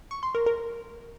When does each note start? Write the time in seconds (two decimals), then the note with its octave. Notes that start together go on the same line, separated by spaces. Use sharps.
0.11 C#6
0.23 C6
0.35 A#4
0.46 A#4